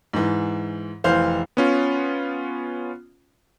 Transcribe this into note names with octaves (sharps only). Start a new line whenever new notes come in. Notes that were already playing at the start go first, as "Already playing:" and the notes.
G#2 E3
F1 E3 C5 F5
B3 C#4 F4